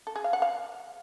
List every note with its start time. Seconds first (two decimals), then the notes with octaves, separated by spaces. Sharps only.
0.07 A4
0.16 G#4
0.24 F5
0.33 F#5
0.42 F5